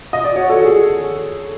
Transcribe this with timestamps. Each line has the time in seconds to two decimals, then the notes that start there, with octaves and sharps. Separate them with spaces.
0.13 D#5
0.24 D5
0.36 F#4 C#5
0.49 A4
0.64 G#4